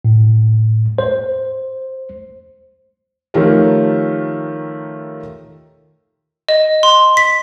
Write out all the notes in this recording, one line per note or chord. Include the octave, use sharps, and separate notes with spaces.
A2
C5
D#3 F3 A3 G4 A#4 C#5
D#5
C6
B6